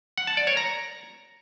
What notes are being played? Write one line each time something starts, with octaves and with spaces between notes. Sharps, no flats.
F#5
A5
D5
C#5
A#5